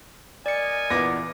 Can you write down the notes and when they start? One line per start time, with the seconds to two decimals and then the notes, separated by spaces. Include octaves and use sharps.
0.46 A#4 D5 D#5 G#5 C#7
0.90 E2 A#2 B3 D6 A#6